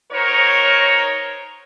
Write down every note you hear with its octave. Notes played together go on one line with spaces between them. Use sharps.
F#3 D#4 A#4 C5 C#5